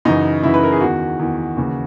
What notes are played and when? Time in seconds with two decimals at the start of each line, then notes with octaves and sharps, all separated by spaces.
0.05 F#2 C#3 E3 D#4
0.43 F#2 C#3 E3 E4
0.54 B4
0.63 A#4
0.72 G#4
0.81 E2 D#3 F#4
1.19 E2 D#3
1.57 D#2 C#3 E3